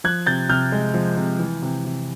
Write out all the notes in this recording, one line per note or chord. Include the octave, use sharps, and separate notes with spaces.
F3 F#6 G#6
C3 G6 A6
C3 F6 G6
G#3
F3
C3
E3
C3
C3